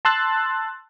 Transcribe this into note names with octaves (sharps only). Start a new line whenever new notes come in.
A5 C6 E6 F#6 A6